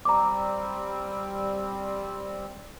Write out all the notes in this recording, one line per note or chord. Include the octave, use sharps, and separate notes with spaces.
G3 C4 A#5 D6